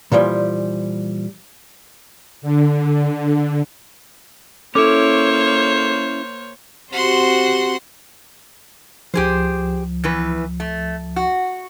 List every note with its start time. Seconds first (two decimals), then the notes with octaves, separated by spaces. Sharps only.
0.12 A#2 E3 F3 G3
2.42 D3
4.75 A#3 C#4 E4 A4 C5 C#5 D6
6.93 C4 F#4 G4 C5 F#5 C6
9.14 C#2 F3 G4 G#4 C5
10.04 E2 E3 B4
10.60 A3
11.16 F#4